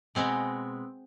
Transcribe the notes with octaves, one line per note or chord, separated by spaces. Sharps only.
B2 G#3 B3 C4